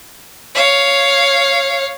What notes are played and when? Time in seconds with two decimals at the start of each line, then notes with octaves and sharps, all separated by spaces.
0.55 C#5 F5